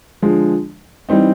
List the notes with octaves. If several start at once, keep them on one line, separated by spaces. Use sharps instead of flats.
D3 F3 G#3
E3 G3 C4 D#4